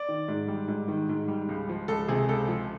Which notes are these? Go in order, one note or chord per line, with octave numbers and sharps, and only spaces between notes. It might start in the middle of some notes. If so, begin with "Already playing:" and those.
Already playing: D5
D#3
G#2
G3
G#2
D#3
G#2
G3
C#2
F3
C#2 A4
C3 G#4
C#2 A4
F3